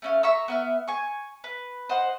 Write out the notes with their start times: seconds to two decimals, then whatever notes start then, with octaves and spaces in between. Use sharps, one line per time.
0.02 A3 C#4 F5
0.23 E5 A#5 C#6 E6
0.48 B3 E5 F6
0.88 G#5 C#6
1.44 B4
1.89 C5 D#5 F#5